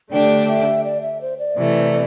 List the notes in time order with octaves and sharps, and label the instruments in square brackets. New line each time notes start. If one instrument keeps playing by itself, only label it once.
[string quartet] D3 A3 D4 G4 [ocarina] D5
[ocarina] E5
D5
E5
C5
D5
[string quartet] C3 E3 A3